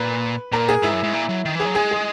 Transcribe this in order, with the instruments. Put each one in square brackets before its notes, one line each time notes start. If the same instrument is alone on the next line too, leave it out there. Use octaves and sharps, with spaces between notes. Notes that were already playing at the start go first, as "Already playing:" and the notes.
Already playing: [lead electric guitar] A#2 [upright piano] B4
[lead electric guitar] A#2 [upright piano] A#4
[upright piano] G#4
[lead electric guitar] G#2 [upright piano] E4
[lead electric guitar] F#2
G#2
A#2
F#3
D#3
[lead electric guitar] E3 [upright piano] G#4
[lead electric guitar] F#3
[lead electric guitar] G#3 [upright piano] G#4
[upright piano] G#4